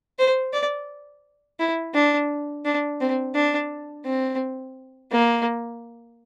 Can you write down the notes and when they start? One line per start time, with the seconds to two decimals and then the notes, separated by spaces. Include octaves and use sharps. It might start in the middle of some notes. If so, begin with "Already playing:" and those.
0.19 C5
0.54 D5
1.60 E4
1.95 D4
2.65 D4
3.01 C4
3.35 D4
4.05 C4
5.12 A#3